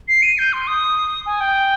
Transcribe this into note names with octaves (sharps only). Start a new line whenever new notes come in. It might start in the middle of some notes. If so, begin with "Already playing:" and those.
C7
D#7
G6
C6
D#6
G#5
G5